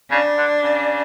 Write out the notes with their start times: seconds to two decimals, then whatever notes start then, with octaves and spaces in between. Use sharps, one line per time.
0.11 C#3 D4
0.37 D3
0.63 C#3